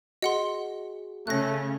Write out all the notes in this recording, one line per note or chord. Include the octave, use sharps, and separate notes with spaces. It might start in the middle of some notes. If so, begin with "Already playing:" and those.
F#4 G#4 D#5 F#5 C6
C#3 A3 C#4 F#6 A#6